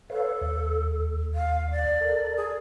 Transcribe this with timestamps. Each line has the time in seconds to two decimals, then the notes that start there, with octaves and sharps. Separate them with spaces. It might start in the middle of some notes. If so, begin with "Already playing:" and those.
0.10 A4 B4 C#5 F5
0.42 D#2
1.35 F5
1.72 D5
2.00 A4 A#4
2.37 G#4